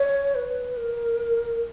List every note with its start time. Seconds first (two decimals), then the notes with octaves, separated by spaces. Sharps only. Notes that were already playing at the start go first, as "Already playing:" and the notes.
Already playing: C#5
0.35 B4
0.77 A#4